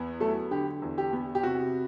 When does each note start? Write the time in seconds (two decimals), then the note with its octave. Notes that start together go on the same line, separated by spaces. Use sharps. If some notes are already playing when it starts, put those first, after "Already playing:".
Already playing: E2 B3
0.20 F#3 A3 A4
0.51 D3 G4
0.82 E2
0.98 G4
1.13 B3
1.35 G4
1.43 C3 F#4